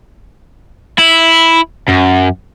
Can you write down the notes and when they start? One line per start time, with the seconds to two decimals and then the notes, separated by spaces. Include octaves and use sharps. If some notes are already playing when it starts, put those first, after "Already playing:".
0.99 E4
1.88 F#2